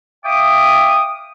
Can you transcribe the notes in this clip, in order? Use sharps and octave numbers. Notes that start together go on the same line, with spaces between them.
E5 F5 G5 D6 D#6